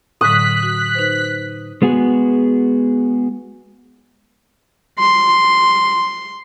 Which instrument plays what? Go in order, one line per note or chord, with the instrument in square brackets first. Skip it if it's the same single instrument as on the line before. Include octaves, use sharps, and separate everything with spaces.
[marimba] A2 D3 F#3 [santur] D#6 [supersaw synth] F#6 B6
[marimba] F#4
D#4 B4 C5
[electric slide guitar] G#3 B3 F#4 G#4
[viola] C6